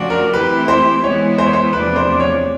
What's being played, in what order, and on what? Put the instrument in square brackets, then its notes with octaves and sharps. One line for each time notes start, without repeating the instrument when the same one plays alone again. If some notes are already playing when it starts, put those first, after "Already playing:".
Already playing: [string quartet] C#3 F3 A3 D4 F#4
[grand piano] A#4
[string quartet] E3 A3 C4 E4 G4 [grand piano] B4
[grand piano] C5
[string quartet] E3 G#3 B3 E4 [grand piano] C#5
[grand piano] C5
C#5
C5
[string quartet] E2 C3 F3 A3 D4 [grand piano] B4
[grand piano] C5
C#5